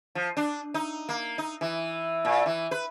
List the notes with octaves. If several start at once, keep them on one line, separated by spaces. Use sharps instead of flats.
F3
D4
D#4
A#3
D#4
E3
A#2
E3
B4